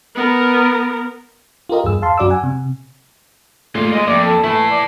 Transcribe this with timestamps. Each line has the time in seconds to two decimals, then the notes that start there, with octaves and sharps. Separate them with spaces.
0.15 B3 A#4
1.69 F4 G4 A#4 D#5
1.84 E2 G2 G#4 E6
2.02 F5 A5 C6
2.18 F#2 F#4 D5 D6 E6
2.30 F#5 G#5
2.43 C3
3.75 D#2 G#3 A3 F4 D5
3.93 G#3 A#3 D#5
4.07 F2 A#3 D5 E5
4.24 A4
4.44 E3 A3 E4 A5
4.70 D5